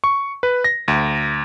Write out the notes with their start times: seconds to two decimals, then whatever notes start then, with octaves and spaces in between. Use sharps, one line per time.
0.04 C#6
0.43 B4
0.64 A#6
0.88 D2